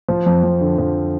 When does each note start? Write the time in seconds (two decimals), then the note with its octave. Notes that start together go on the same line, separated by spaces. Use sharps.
0.09 F3
0.26 F2
0.43 F2
0.61 D3
0.78 F3